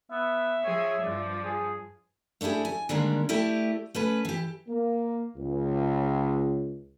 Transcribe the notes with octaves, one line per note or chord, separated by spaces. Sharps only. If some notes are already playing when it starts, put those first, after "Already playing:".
B3 E5
F3 G#4 C#5
G2 F3 D5
G#4
A3 D4 E4 G4 G#4
G#5
D3 D#3 G3 G#3 A#3 D4
A3 E4 G4 D5
A3 C#4 B4
E3 G4
A#3
C#2